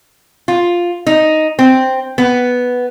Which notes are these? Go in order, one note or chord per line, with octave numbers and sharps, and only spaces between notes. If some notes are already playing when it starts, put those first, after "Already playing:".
F4
D#4
C4
B3